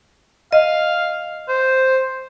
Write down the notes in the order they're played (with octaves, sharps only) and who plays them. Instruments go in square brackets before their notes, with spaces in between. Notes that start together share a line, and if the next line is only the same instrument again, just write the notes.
[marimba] D#5 [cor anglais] F5
[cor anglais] C5